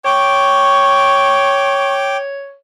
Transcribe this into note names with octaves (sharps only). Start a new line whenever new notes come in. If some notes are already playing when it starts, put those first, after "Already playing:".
C#5 G5 C#6 D6